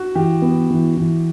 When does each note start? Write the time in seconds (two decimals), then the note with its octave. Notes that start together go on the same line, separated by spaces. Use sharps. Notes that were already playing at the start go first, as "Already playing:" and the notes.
Already playing: F#4
0.15 E3 G4
0.42 B3
0.70 E3
0.97 E3